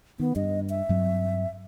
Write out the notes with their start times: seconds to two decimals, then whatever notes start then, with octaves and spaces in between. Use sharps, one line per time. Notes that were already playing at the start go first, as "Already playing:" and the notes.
0.20 D#3 B3
0.36 G2 D#5
0.70 E5
0.89 G2 F#3 C4